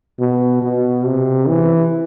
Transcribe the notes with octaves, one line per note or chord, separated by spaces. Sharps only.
B2
B2
C3
E3